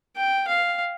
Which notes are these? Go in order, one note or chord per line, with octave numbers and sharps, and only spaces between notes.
G5
F5